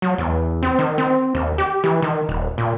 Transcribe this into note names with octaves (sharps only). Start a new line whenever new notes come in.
F#3
E2
C4
D#3
C4
D#2
G4
E3
D#3
D#1
A#2